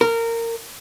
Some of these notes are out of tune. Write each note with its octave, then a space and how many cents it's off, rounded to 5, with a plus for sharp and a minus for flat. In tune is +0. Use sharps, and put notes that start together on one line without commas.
A#4 -20